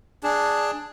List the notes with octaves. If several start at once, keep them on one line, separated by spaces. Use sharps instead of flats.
D4 G#4